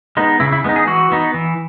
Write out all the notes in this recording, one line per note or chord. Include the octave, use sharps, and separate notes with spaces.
G#3 B3 D#4
C#3 E4
E4
G#3 B3 D#4
G#4
E3 F#4
B3 D#4
E3